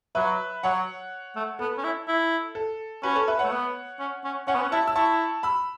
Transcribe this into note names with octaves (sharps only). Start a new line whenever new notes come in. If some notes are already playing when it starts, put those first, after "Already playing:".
F#3 B4 E5
F#3 C#5 F#5
A3
B3 A4
C#4
E4
E4
A4
C#4 F#4 B4
A4 C#5
B4 E5
A3 C#5 F#5
B3
C#4
C#4
C#4 C#5 F#5
B3
C#4
E4 E5 A5
E6
E4 A5 C#6
B5 E6